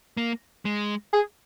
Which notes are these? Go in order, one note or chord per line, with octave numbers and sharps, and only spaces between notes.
A#3
G#3
G#4